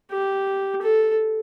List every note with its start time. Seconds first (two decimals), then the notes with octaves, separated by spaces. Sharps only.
0.12 G4
0.82 A4